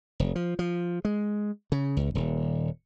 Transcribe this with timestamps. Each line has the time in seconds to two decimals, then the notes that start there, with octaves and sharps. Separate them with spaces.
0.20 F1
0.35 F3
0.59 F3
1.05 G#3
1.72 C#3
1.97 C#2
2.15 D#1